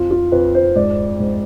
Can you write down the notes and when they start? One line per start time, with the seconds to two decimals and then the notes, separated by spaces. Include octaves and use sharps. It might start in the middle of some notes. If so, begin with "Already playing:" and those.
Already playing: F2 F4
0.11 F4
0.32 F2 B4
0.55 C5
0.75 G#2 D5
1.19 G#2